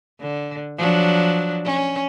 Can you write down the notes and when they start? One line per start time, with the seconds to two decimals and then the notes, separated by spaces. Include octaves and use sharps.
0.21 D3
0.78 F3 F#3 D4
1.65 C#4